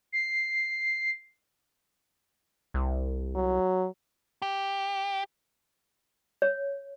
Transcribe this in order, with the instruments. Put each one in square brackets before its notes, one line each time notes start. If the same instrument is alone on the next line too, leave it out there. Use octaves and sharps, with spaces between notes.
[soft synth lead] C7
[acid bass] C2
[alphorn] F#3
[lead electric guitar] G4
[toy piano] C#5